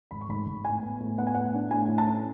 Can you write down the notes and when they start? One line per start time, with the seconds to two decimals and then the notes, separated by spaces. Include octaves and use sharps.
0.11 G#1 B5
0.21 C#6
0.29 G#1 B5
0.46 G#1
0.65 A2 G#5
0.82 B3
1.00 A2
1.18 B3 F#5
1.27 G#5
1.34 A2 F#5
1.54 D4
1.71 A2 G#5
1.88 A2
1.98 A5
2.07 C#4